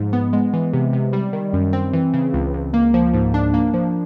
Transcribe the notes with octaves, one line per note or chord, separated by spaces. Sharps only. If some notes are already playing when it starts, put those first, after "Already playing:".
Already playing: G#2 F3 G#3
B3
G#3
E3
C3
C3
G3
D#3
F#2
C4
E3
C#3
C#2
C#2
A#3
F3
G#2
D4
A#3
F3